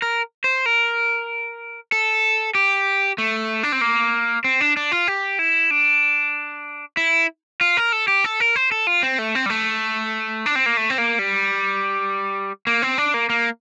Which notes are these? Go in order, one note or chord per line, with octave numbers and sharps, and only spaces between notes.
A#4
C5
A#4
A4
G4
A3
D4
C4
A#3
C4
D4
D4
F4
G4
E4
D4
E4
F4
A#4
A4
G4
A4
A#4
C5
A4
F4
C4
A3
C4
G3
A3
D4
C4
A#3
A3
C4
A#3
G3
A#3
C4
D4
A#3
A#3